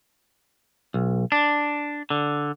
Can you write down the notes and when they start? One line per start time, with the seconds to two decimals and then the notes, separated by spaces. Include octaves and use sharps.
0.94 B1
1.32 D4
2.10 D3